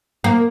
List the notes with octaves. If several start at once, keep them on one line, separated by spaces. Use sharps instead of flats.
A#3